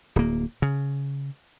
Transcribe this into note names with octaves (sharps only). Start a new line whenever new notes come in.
D1 A#3
C#3